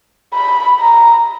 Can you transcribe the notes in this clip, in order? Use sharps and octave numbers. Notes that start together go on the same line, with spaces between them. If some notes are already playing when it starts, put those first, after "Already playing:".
B5
A#5